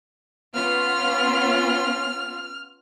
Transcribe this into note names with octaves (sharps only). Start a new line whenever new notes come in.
B3 C#4 F4 F6